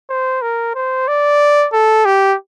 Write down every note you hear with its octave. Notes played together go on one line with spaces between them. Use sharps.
C5
A#4
C5
D5
A4
G4